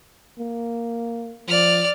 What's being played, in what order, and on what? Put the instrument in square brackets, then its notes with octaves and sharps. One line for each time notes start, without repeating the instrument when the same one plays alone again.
[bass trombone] A#3
[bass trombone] F3 [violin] D5 F6